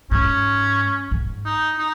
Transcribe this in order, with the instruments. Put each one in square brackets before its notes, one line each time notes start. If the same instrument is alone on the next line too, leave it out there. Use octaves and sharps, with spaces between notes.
[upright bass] G#2 [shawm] C#4
[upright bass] G#2
[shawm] D#4
D#4